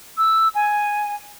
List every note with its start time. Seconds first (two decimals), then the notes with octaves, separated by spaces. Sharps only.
0.18 E6
0.55 G#5